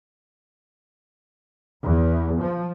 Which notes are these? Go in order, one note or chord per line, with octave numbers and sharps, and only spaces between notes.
E2
F3